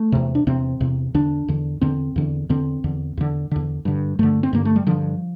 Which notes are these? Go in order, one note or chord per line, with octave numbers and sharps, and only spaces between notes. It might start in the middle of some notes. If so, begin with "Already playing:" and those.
Already playing: A3
E2 C3
D4
E2 C3 C4
E2 C3
E2 D3 D4
E2 D3
E2 D3 C4
E2 D3
E2 D3 C4
E2 D3
E2 D3
E2 D3
G2 D3
G2 D3 A3
C4
G2 D3 A#3
A3
G3
G2 D3 F3